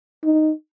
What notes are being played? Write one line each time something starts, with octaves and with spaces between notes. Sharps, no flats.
D#4